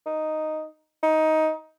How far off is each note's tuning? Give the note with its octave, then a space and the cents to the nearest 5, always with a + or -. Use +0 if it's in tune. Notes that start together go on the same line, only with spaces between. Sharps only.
D#4 +0
D#4 +15